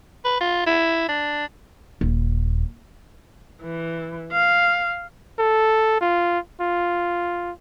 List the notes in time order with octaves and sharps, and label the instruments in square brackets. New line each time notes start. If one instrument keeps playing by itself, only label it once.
[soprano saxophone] B4
F4
E4
D4
[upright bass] D#1
[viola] E3
F5
[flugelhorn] A4
F4
F4